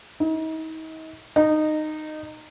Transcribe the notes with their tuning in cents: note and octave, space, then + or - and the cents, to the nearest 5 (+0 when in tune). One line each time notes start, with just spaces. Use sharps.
D#4 +40
D#4 -15